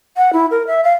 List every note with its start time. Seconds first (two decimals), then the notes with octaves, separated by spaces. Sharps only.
0.17 F#5
0.33 E4
0.51 A#4
0.67 E5
0.84 F5